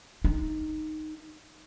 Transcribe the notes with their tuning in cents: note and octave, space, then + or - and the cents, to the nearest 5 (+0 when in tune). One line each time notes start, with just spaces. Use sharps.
D#4 -5